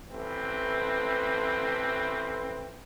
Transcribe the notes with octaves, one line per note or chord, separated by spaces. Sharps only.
A1 A3 C4 B4